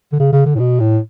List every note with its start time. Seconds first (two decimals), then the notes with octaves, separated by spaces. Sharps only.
0.13 D3
0.20 C#3
0.33 C#3
0.46 D3
0.55 A2
0.59 B2
0.80 A2